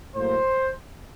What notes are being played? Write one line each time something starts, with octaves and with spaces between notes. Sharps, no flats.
A2 F#3 A#3 C5